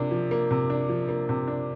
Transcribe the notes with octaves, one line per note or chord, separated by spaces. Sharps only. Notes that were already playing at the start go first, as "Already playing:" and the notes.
Already playing: C3 F3 A#3 D4
F3
A#3
C3
D4
F3
A#3
C3
D4